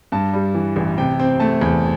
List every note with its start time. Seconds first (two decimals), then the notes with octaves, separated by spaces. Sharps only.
0.12 G2 A5
0.33 G3
0.54 E3
0.76 A1
0.98 C3 G5
1.19 C4
1.40 A3 A5
1.61 E2